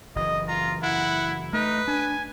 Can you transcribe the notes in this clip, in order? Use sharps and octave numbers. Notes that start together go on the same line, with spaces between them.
F#1 E3 D#5
F4 A#5
E4 F#5
A3 D#4 B4
D4 G#5